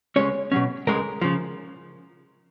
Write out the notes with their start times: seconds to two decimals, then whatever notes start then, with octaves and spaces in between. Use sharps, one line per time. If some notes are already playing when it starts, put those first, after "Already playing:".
0.16 C#2 B2 G#3 C#4 C#5
0.52 B2 F#3 C#4
0.87 C#2 C#3 G#3 A#4
1.21 C#3 F3